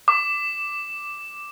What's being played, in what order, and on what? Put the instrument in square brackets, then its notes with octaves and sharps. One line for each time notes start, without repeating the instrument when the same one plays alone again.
[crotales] D6